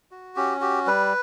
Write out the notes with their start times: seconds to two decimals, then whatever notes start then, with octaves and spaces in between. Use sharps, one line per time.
0.11 F#4
0.36 C#4 G4
0.61 F#4 G4
0.86 G3 B4